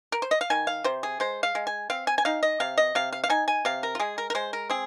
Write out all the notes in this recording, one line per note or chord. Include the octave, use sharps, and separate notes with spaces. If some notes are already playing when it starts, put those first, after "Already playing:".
A#4
C5
D#5
F5
D#3 G#5
F5
C3 C5
G#4
G#3 C5
F5
G#3
G#5
C4 F5
G#5
G#5
D#4 F5
D#5
C3 F5
D#5
C3 F5
F5
F5
D#4 G#5
G#5
C3 F5
A#4
F4
G#3 G#4
A#4
A#4
G#3 C5
A#4
C4 G#4